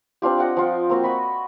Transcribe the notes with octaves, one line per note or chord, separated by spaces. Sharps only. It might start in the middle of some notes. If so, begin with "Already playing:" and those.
C4 D4 F4 G4
D#5 F#5 G5
F3 F4 G5
A#3 C4 F#4
F#4 D#5 B5 C#6